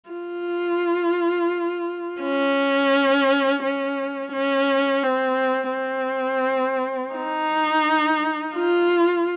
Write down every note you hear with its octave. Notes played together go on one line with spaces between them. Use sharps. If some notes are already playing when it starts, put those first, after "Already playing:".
F4
C#4
C#4
C#4
C4
C4
D#4
F4